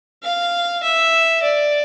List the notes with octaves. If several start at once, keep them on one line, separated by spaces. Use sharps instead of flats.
F5
E5
D5